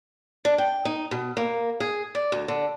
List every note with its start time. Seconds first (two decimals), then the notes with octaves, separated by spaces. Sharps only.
0.45 D4
0.58 G5
0.85 D#4
1.11 B2
1.37 A#3
1.80 G#4
2.15 D5
2.32 D2
2.48 D3